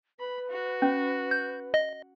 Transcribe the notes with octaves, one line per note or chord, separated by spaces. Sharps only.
B4 B5
F#4
C#4
G6
D#5